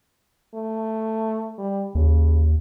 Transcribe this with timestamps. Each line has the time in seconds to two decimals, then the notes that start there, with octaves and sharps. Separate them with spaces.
0.54 A3
1.58 G3
1.95 D#2 C#3